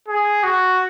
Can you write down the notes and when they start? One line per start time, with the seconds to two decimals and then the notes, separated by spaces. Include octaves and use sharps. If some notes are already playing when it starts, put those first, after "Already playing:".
0.08 G#4
0.43 F#4